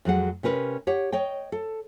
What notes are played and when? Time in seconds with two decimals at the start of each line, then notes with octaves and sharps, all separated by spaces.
0.05 F2 F#3 G#3 F#5
0.43 C3 C#4 A#4 B4
0.87 G4 C#5 F#5
1.12 C#5 D#5 G5
1.52 A4